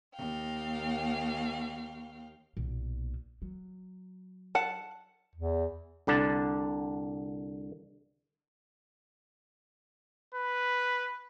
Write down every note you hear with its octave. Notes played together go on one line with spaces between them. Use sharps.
D#2 F5 G5
B1 A#2
F#3
F#5 A5
E2
C2 D3 D4 A5
B4